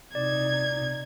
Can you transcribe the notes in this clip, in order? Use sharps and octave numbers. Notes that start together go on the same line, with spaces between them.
C3 D#4 D5 G#6